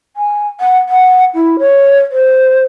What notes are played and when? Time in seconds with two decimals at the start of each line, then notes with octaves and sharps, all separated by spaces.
0.16 G#5
0.60 F#5
0.89 F#5
1.35 E4
1.59 C#5
2.11 C5